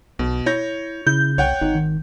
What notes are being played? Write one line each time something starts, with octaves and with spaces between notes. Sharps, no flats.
B1 B2
E4 C#5 G6 A#6
C#3 E4 G6
C2 C#5 F#5 G5
G#1 D#4
D#3